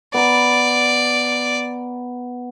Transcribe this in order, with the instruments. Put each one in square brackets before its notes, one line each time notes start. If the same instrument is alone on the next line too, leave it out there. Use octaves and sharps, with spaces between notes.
[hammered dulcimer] B3 A#5 [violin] D5